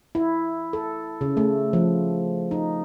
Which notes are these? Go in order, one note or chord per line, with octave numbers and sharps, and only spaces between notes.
E4
A4
C#3
A3
F3
D#4